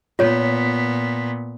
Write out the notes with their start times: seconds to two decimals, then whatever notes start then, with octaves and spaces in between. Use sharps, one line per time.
0.19 A#2 B3 F4 C#5